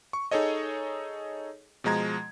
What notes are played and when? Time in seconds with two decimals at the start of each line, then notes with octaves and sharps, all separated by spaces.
0.13 C#6
0.31 D#4 G#4 A4 C#5 D#5
1.84 B2 F3 G#3 A#5 G#6